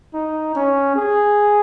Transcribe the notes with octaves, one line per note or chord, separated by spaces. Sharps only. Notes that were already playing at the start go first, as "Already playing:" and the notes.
D#4
C#4
G#4